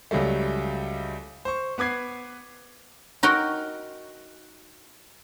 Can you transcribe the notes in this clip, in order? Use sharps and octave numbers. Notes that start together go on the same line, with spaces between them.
C#2 F#3 G3 A3
C5 C#6
B3 B4 D6 G#6 C7
D#4 F#4 A#4 G5